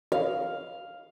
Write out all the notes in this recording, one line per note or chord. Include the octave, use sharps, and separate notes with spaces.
F5